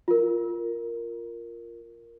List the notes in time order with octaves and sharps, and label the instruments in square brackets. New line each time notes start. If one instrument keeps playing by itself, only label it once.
[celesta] F4 A#4